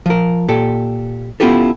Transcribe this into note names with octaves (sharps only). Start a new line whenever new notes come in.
F3 A#4
A#2 G4 A4
B3 C#4 E4 F4 G4 A4